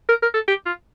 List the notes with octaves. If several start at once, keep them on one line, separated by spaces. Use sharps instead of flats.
A#4
A#4
A4
G4
F4